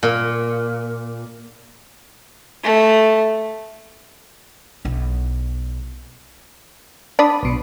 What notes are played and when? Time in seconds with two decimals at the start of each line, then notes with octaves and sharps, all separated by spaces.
0.03 A#2
2.63 A3
4.85 B1 E4
7.19 D4 D5 B5 D#6
7.43 B1 B2